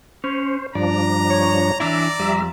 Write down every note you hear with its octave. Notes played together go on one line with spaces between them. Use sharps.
C#4 C5
G2 F3 D4 D5 A#5
C#5
E3 D4 E4 D5 E5 A#5
F2 G3 E5